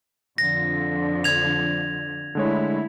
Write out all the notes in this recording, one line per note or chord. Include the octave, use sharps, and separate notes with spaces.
F2 D3 F3 A#6
G#6 F7
D3 G#3 A3 E4 C#5